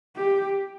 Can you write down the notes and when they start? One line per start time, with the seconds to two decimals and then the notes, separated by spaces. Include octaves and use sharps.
0.16 G4